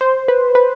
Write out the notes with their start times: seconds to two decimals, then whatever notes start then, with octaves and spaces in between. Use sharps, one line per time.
0.01 C5
0.28 B4
0.55 B4